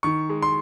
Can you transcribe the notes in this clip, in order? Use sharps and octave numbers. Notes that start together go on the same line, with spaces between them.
D#3 C#6
G#3
C6